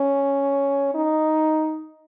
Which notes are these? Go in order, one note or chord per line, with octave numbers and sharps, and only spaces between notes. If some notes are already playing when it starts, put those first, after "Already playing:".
Already playing: C#4
D#4